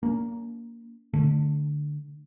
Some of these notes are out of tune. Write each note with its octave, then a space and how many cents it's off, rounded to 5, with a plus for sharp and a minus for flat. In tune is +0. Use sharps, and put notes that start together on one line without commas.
A#3 +0 D4 -45
D3 +10 A3 +0